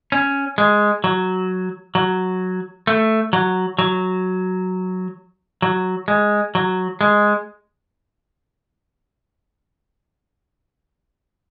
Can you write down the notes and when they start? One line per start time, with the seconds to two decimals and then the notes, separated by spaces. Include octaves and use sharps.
0.12 C#4
0.58 G#3
1.04 F#3
1.95 F#3
2.87 A3
3.33 F#3
3.79 F#3
5.62 F#3
6.08 G#3
6.55 F#3
7.01 G#3